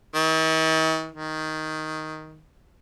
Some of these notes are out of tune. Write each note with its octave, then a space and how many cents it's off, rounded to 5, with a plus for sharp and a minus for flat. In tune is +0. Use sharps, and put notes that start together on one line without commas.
D#3 +45
D#3 +5